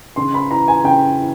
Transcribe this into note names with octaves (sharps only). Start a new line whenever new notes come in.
C#3 C6
B5
E3 A#5
G#5
C#3 G5
E3